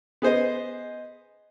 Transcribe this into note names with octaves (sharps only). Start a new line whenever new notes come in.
B3 G#4 C5 D#5